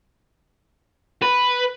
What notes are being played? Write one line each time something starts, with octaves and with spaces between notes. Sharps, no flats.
B4